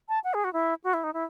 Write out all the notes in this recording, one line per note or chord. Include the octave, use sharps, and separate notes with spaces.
A5
F#5
G#4
F#4
E4
F#4
E4
D#4
E4